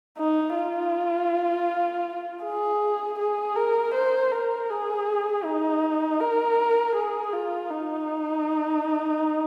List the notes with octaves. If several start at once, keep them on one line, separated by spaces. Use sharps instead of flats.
D#4
F4
G#4
G#4
A#4
C5
A#4
G#4
D#4
A#4
G#4
F4
D#4